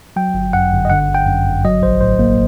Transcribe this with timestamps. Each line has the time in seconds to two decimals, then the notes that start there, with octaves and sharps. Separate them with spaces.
0.16 F#3 G5
0.34 G1
0.53 F#2 F#5
0.72 G1
0.85 D#5
0.90 D3 F#5
1.09 G1
1.15 G5
1.27 F#2
1.46 G1
1.65 F#3 D#5
1.82 A#1 C5
2.01 A2 C5
2.19 A#3